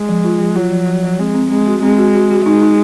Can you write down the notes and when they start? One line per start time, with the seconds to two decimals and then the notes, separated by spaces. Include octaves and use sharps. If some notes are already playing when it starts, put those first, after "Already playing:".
Already playing: G#3
0.09 F3
0.24 F4
0.40 F3
0.56 F#3 F4
0.71 F3
0.87 F3
1.03 F3
1.19 G#3 C4
1.34 C4
1.51 G#3 C4
1.67 F#4
1.83 G#3 C4
1.98 F#4
2.15 F#4
2.31 F#4
2.46 G#3 D#4
2.62 D#4